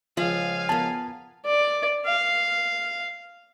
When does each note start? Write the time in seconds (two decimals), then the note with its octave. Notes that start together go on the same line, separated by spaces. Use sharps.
0.17 C#2 F3 F4 F5 F#5 G#5
0.69 B3 A#4 A5
1.46 D5
2.06 F5